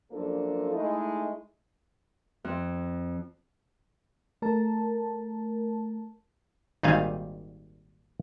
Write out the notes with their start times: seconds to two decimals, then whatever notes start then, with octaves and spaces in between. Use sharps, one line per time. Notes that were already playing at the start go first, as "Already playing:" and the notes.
0.12 F#2 F3 A#3 D4 A4
0.72 G#3 A3 D#4 E4
2.44 F2
4.42 A3 A#4 A5
6.83 G#1 A#2 D#3 G3 F5 G#5